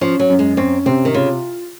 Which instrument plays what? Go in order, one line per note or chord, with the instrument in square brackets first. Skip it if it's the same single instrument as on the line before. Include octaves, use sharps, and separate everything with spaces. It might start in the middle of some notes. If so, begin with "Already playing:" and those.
[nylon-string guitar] F3 [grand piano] C#4
[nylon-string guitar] F#3
[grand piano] F#2
[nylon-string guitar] G#3
[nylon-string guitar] C4 [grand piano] C#4
[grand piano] C3 [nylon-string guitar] C4
[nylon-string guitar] D#3
[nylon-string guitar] C#3 [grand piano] F4